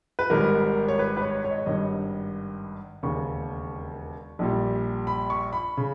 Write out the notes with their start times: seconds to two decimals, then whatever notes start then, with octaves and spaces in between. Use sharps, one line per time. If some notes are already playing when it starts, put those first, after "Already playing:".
0.19 B4
0.30 G#1 G#2 G3 A#4
0.88 C#5
0.99 B4
1.17 B4
1.22 C#5
1.44 C#5
1.51 D#5
1.58 C#5
1.66 G#1 G2 G3 D#5
3.03 E1 D#2 C#3 C#6
4.39 A#1 A#2 G3
5.07 B5
5.30 C#6
5.53 B5
5.77 C#3